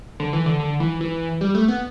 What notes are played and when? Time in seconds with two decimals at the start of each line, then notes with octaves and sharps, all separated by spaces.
0.20 D3
0.33 E3
0.46 D3
0.60 D3
0.80 E3
1.01 E3
1.41 G3
1.55 A3
1.68 B3